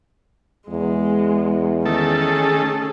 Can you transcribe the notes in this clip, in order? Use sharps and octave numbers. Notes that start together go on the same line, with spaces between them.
E2 G#3
D#3 A3 C#4 G#4 A4